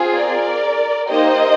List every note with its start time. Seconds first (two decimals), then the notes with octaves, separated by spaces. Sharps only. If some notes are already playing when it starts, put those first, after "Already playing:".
Already playing: C4 F4 G#4
0.16 A#4 D5
1.10 A#3 D#4 G4 C5 D#5